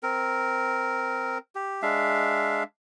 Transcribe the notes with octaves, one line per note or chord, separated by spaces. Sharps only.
C4 A#4
G4
G#3 D4 E5 F5